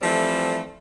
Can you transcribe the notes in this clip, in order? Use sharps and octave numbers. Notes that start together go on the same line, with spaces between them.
E3 F3 G3 A3 C4 A4